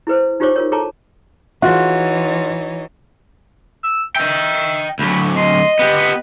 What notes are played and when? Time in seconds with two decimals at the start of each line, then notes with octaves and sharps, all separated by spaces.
0.07 E4 G#4 B4 C5
0.40 D#4 F4 G4 C5 C#5 D6
0.56 F4 A#4 C#5
0.72 G#4 A4 C#5 A5 A#5 D6
1.62 E3 D#4 F4 F#4 G#4 C#5
3.83 E6
4.16 D#5 E5 G5
4.99 D2 F#3 B5
5.36 D#5 C6
5.79 B3 G4 B4